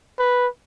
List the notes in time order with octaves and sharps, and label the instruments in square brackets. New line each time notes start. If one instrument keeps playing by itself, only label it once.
[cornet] B4